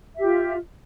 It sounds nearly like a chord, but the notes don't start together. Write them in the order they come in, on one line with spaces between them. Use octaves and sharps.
E5 G4 F4